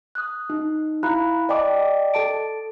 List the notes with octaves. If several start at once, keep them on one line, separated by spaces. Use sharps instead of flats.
D#6 F#6
D#4
E4 F5 A#5 B5 F#6
D5 D#5 G5 A5 D6
A4 A5 D7